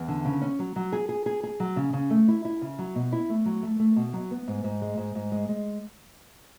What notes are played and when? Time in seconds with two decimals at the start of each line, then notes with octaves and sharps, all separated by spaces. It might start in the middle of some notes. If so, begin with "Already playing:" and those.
Already playing: E2
0.08 D3
0.25 C#3
0.42 C#4
0.59 F#3
0.76 F#3
0.92 G#4
1.09 G#4
1.26 G#4
1.43 G#4
1.60 F#3
1.76 C#3
1.93 C#3
2.10 A3
2.28 E4
2.45 E4
2.62 C#3
2.79 F#3
2.95 B2
3.12 E4
3.29 A3
3.46 F#3
3.63 A3
3.80 A3
3.96 B2
4.13 F#3
4.31 B3
4.48 G#2
4.64 G#2
4.82 G#3
4.97 G#2
5.15 G#2
5.32 G#3
5.49 G#3